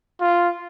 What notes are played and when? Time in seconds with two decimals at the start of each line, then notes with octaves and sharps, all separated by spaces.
0.21 F4